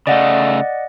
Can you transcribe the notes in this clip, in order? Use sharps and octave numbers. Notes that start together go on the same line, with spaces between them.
C#3 A3 D5 D#5 F#5